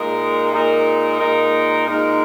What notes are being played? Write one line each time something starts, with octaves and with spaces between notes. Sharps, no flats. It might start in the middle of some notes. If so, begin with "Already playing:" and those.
Already playing: A#2 G#3 D#4 A#4
A#2 G#3 D#4 A#4
A#2 G#3 D#4 A#4
A#2 G#3 D#4 A#4